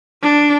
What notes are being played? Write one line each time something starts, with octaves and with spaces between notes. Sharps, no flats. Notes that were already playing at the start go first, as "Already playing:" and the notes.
D4